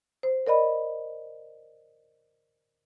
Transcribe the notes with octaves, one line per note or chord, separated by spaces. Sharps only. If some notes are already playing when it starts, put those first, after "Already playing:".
C5
A#4 D5 D#5 B5